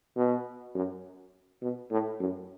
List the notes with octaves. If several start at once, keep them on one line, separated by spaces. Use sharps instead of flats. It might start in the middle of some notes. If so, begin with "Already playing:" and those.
B2
F#2
B2
A2
F#2